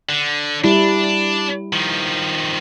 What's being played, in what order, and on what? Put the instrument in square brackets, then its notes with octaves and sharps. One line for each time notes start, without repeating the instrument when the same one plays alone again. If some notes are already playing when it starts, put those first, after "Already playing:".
[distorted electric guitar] D3
[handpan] G3 E4 [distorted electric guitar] D4
[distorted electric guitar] D#3 F3